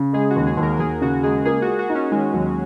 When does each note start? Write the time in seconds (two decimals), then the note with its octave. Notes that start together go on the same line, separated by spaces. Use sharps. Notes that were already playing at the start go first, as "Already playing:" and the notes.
Already playing: C#3
0.13 G#3 G#4
0.30 F#4
0.36 D#2
0.47 G#4
0.57 D#2
0.63 A#4
0.80 D#2 G#4
1.02 C#3 F#4
1.23 G#3 G#4
1.45 A#3 G#4
1.62 F#4
1.67 A#3
1.79 F#4
1.89 D#4
1.95 C#4
2.11 D#3 G#3
2.33 D#2 F#3